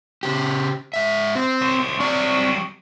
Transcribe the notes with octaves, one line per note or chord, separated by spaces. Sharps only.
C#3 G4
G#2 E5
C4
F#3 C5
F#3 G3 C4 D5